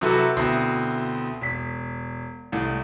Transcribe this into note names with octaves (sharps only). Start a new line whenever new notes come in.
C3 F#3 E4 F#4 A4 B4
D2 B2 C4 E4
E1 B6
C2 A2